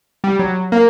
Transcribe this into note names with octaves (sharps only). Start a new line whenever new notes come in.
G3
F#3
A#3